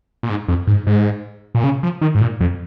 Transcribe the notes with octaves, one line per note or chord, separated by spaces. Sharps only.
A#2
G#2
F2
G#2
G#2
A#2
C#3
F3
D#3
G#2
A#2
F2